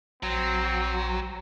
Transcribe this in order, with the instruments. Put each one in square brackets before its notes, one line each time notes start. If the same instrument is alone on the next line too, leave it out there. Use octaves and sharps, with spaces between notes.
[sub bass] A#1 [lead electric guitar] F#3 [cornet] C4